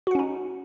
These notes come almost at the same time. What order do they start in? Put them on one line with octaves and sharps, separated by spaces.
F#4 F#5 C#4 D#4